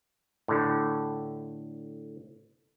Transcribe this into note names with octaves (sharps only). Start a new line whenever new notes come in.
A2 D3